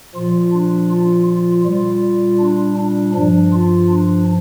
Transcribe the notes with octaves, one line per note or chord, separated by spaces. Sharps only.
A#2 F3 F4
D4
F4
F4
A#2 G3 F4
D4
D4
G2 F3 D4
F4
D4